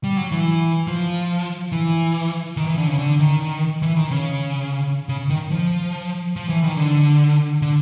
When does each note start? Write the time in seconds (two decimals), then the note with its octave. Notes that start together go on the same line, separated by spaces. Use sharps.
0.04 G3
0.17 F#3
0.32 E3
0.87 F3
1.72 E3
2.57 D#3
2.67 E3
2.78 D3
2.88 C#3
2.99 D3
3.19 D#3
3.82 E3
3.97 D#3
4.11 C#3
5.09 C#3
5.30 D#3
5.51 F3
6.36 F3
6.50 E3
6.64 D#3
6.77 D3
7.62 D3